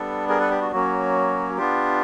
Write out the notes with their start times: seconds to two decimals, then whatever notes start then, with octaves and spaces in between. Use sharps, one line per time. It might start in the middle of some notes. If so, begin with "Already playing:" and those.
Already playing: G3 B3 D4 A4
0.29 G#4 A#4
0.40 A4 B4
0.50 G4
0.61 F#4
0.72 F#3 A#3 C#4 F#4
1.57 B3 D4 F4 G4